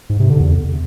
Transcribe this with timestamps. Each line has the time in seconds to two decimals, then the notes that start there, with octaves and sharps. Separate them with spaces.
0.10 G#2
0.20 C3
0.30 D3
0.40 E2